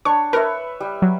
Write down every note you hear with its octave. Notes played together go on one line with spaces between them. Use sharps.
D4 C#5 C#6
A#4 B4 C#5 E5
G3
F#3